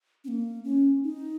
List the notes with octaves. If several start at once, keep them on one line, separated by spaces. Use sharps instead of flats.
C#4
A#3
C#4
D#4